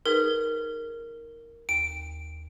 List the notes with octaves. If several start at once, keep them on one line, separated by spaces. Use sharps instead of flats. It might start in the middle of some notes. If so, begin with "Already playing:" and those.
D#4 G#4 A#4 B4
D#2 D7